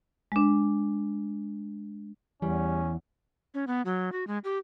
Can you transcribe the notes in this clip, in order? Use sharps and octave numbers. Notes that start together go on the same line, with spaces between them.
G#3 D4
E2 E3 G3 C#4
C#4
B3
F#3
F#4
G#3
G4